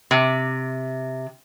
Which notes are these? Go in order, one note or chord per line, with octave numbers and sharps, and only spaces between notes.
C3